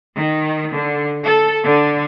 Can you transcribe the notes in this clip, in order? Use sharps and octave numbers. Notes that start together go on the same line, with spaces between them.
D#3
D3
A4
D3